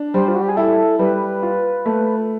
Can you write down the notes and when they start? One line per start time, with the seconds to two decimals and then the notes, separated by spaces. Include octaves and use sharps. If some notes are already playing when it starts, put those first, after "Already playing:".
Already playing: D4
0.14 G3 C5
0.28 F4
0.35 F#4
0.42 G4
0.49 G#4
0.57 E4 A4
0.99 G3 B4
1.43 F4
1.86 A3